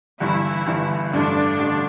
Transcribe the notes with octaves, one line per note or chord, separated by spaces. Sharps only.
G1 G2 E3 E4
G1 G2 E3
A1 G2 D3 D4
A1 G2 D3